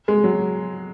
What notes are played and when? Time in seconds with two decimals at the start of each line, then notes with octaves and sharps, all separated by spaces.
0.08 G#3
0.24 F#3